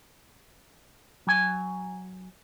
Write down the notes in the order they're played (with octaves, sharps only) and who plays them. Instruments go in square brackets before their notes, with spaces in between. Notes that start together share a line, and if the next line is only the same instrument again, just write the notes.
[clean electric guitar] F#3 G#5